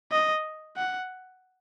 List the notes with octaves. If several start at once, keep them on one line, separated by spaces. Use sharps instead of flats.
D#5
F#5